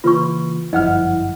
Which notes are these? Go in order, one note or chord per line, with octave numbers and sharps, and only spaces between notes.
C#3 E3 A#3 F4 B4 C#6
G1 F#2 F3 E4 D#5 F#5 F6